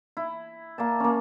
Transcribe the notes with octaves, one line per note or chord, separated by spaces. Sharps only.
E4
A#3 D5 A5
A#3 C#4